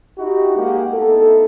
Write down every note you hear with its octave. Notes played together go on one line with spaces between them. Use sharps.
D#4 E4 F#4 G4
G#3 A#3 G4 G#4 F#5
A3 B3 D#4 E4 A4